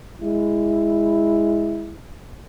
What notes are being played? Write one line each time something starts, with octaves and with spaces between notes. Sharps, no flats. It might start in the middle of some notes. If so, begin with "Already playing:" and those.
G#3 E4